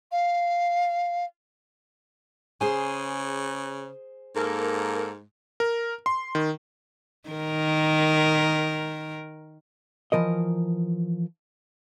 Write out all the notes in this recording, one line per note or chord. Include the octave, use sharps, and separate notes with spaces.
F5
C#3 G#4 C5 G#5
G#2 A#3 A4 A#4
A#4
C6
D#3
D#3 A#4
E3 F3 A#4 D#5